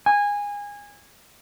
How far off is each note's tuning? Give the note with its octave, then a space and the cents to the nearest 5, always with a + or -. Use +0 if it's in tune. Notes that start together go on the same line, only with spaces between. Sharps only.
G#5 -20